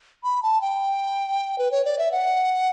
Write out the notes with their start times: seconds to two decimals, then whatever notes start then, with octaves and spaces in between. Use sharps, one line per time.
0.24 B5
0.43 A5
0.61 G5
1.58 B4
1.71 C#5
1.85 D5
1.98 E5
2.12 F#5